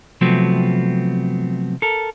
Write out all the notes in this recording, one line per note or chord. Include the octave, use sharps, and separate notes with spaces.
C3 F3 F#3 A3 B3 C4
A4 A#4